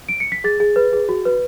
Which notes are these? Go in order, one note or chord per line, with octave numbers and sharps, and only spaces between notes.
D7
C#7
B6
G#4 A6
G#4
B4
G#4
F#4
B4